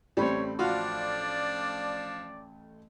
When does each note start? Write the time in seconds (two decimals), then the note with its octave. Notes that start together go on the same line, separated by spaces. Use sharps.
0.17 A1 G3 A3 C4 C#5 B5
0.59 F3 D4 F4 F#4 D5